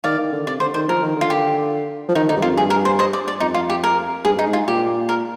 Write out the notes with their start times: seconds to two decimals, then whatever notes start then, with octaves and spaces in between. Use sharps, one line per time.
0.04 D#3 D5 F5
0.19 D#3
0.32 D3
0.46 C3 D5
0.60 D3 C5
0.74 D#3 C5
0.88 F3 A#4
1.03 D#3
1.17 D3 F4
1.30 G4
2.09 F3
2.15 D#3 D#4
2.29 D3 D#4
2.37 G2
2.42 F2 F4
2.56 G2 G#4
2.70 A#4
2.85 C5
2.99 C5 D#5
3.13 D5
3.28 D5
3.40 F2 D#4
3.54 F4
3.70 G4
3.84 A#4
4.25 G2 G#4
4.36 G2 D#4
4.46 G#2
4.53 F4
4.68 A#2 G4
5.09 A#4